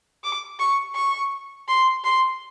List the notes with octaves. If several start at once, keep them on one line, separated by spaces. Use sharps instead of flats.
D6
C#6
C#6
C6
C6